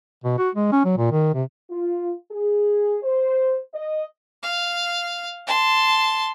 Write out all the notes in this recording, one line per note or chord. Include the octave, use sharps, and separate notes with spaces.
B2
F#4
G#3
C#4
F#3
A#2
D#3
C3
F4
G#4
C5
D#5
F5
A5 C6